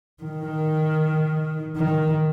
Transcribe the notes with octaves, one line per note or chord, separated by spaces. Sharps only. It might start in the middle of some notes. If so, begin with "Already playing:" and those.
D#3
D#3